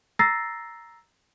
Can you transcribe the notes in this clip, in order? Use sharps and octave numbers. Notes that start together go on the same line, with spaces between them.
A#5 E6 A6 A#6 C7